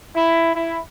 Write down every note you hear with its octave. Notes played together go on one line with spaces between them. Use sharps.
E4
E4